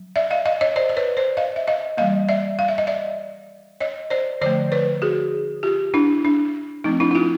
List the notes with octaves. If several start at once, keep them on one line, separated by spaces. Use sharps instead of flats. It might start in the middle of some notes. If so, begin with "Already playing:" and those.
Already playing: F#3
D5 E5
D#5 F5
D#5 F5
C#5 D#5
C5 D5
D5
B4 C#5
C5 D5
D#5 F5
E5
D#5 F5
E3 G3 A#3 D#5 F5
D5 E5
F5
E5
D#5
D5 E5
C#5 D#5
C5 D5
D3 F3 A3 C5 D5
B4 C#5
F#4 G#4
F4 G4
D4 E4
D4
F3 A3 C4 D#4
D4 E4
E4
D#4 F4